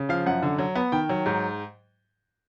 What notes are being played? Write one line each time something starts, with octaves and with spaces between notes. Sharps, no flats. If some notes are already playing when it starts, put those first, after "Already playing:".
Already playing: C#3
F3 F5
F#2 F#5
D3
F#3
B3
D#3 G5
F#3
G#2